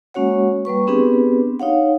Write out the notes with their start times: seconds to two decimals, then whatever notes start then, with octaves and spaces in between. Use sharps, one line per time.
0.14 G#3 A#3 C#4 F#4 C#5 F#5
0.65 G3 A#3 B4 C#6
0.87 B3 C4 D4 G4 G#4 B4
1.60 D#4 C#5 F5 F#5